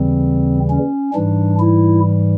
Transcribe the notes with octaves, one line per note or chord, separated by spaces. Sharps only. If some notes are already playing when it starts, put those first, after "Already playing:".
Already playing: D#2 C#3 E3 G3 C4
C#4
G#2 E3 G3 D4
E4